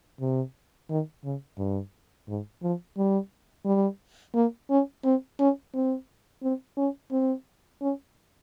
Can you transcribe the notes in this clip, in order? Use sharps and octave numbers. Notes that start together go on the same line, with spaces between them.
C3
D#3
C#3
G2
G#2
F3
G3
G3
A#3
C#4
C4
C#4
C4
C4
C#4
C4
C#4